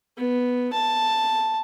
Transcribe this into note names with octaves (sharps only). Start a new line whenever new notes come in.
B3
A5